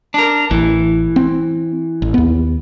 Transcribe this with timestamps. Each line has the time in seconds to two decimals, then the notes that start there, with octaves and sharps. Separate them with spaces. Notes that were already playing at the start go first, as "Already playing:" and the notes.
0.14 D4 A#4
0.51 A1 E3
1.16 C4
2.02 A1
2.14 D#2 B3